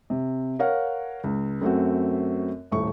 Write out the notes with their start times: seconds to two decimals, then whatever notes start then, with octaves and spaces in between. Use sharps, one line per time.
0.10 C3
0.59 A#4 C#5 F5 F#5
1.24 C#2
1.61 F#2 A3 C4 F#4
2.71 D#1 A2 C#6